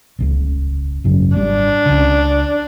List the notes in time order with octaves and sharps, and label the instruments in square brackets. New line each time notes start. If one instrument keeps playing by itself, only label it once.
[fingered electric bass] D#1 C#2 C#3
G#1 F#2 C#3
[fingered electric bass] G#1 G3 [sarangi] D4
[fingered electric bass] C#2 C#3